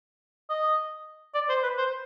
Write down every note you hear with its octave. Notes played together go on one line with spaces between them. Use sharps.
D#5
D5
C5
B4
C5